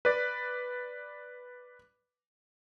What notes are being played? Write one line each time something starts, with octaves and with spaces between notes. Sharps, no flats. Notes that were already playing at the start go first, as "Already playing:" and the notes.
B4 D5